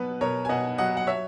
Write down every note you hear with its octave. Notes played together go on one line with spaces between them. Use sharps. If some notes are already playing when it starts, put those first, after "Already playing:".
Already playing: B2 F#3 B3 B4
B2 A#4 C#5
G#5
B2 D#5 F#5
F#3 D#5 F#5
F#5
C#5 E5